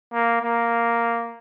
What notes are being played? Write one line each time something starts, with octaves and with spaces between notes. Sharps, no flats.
A#3
A#3